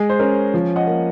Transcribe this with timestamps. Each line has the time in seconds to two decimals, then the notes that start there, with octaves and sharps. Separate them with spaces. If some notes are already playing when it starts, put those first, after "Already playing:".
Already playing: G#3 G#4
0.10 C5
0.19 C#4 A#4
0.54 F3
0.76 D#5 F#5
0.87 A#3